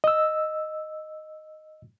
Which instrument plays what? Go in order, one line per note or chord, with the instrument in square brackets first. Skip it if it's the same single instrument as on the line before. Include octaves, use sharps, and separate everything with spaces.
[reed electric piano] D#5 E6